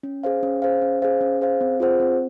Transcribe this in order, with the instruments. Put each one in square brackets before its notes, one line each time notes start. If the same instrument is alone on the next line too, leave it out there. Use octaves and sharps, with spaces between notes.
[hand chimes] C#4
G#4 C5 F5
C#4
G#4 C5 F5
C#4
G#4 C5 F5
C#4
G#4 C5 F5
C4
F4 G#4 C5 F#5
C4